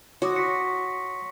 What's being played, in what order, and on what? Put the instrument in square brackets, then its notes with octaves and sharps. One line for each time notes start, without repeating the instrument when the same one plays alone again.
[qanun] F#4 [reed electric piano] C#5 D6 D#6 [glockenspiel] C6 A#6
[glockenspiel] C#6 B6 C#7